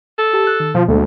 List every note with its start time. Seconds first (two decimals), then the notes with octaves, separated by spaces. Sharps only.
0.19 A4
0.33 G4 A5
0.47 F#6
0.60 D#3
0.75 B2 F3
0.88 D2 G#3 A#3 A4